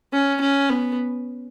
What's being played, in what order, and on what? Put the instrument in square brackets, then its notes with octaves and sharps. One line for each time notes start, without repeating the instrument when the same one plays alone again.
[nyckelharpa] C#4
C#4
B3